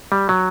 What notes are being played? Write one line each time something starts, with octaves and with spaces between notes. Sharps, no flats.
G3
F#3